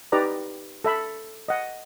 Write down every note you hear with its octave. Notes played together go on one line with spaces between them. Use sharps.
D#4 G4 B4 D5 A#5
A4 E5 B5
D#5 F#5